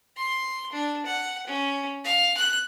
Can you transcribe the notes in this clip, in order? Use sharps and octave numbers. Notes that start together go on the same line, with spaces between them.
C6
D4
F#5
C#4
F5
F#6